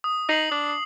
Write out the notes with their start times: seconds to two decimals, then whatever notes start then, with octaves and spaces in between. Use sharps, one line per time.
0.04 D#6
0.29 D#4 D#6 C7 F#7
0.51 D4